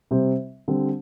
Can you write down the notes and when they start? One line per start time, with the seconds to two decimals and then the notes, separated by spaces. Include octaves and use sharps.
0.11 C3 G3 C4 G4 C5
0.68 D3 G3 C4 G4